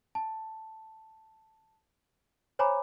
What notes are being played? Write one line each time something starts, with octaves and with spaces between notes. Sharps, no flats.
A5
C5 C#5 G#5 A#5 B5 D6